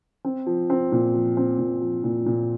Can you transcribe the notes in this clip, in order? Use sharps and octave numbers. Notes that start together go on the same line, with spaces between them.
C4
F3
C4
A#2
F3
C4
A#2
F3
A#2
A#2